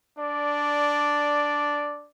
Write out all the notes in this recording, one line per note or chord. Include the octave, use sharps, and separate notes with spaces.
D4 D5